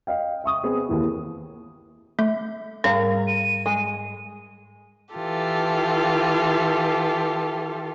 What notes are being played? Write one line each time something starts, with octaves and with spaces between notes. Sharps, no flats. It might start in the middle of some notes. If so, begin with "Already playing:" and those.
D#5 F5 G5
E5 C#6 D#6
B3 C4 G#4
D#2 E3
A3
G#2 G3 A#4 F5 A#5
D#7
G#3
E3 F4 G4 A4